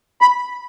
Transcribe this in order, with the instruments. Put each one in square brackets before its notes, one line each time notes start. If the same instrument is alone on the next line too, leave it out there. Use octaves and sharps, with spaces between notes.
[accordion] B5